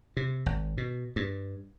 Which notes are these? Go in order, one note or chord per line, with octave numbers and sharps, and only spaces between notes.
C3
G#1
B2
G2